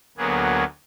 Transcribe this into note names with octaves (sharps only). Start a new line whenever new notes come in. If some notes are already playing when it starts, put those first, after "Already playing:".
D2 F#3 A#3 B3 G#4